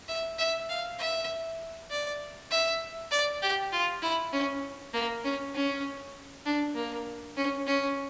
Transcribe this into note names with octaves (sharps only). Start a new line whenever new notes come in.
E5
E5
F5
E5
D5
E5
D5
G4
F4
E4
C#4
A#3
C#4
C#4
D4
A#3
C#4
C#4